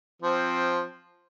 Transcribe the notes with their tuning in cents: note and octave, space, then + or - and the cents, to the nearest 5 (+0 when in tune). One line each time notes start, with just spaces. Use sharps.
F3 +5 C4 +0